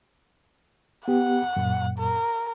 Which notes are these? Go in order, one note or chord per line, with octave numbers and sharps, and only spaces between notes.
B3 G4 F#5
F#2 A#2
A#4